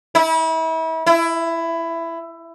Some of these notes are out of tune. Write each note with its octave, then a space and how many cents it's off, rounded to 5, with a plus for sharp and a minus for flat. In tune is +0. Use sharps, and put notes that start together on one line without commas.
E4 -35
E4 +15